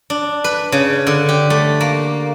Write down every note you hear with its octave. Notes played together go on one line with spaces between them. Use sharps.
D4
B4
C#3
D3
G4
A3
A#3